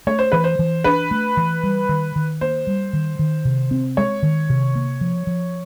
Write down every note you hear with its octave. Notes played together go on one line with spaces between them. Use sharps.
A3 C#5
C5
E3 B4
C5
E3
D4 B4
A3
E3
G3
D#3
D#3
A#3 C5
G3
D#3
D#3
C3
C4
G#3 C#5
D#3
C3
A#3
F3
F3